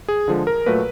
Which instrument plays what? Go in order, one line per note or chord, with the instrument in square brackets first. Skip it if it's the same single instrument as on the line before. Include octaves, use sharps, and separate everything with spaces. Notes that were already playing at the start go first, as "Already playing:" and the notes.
[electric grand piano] G#4
D3 F3 G#3
A#4
A#2 F#3 A3 B4